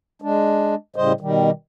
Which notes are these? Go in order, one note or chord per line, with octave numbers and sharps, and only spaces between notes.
G#3 D4
A2 C#3 G3 C5 D#5
B2 D#3 G3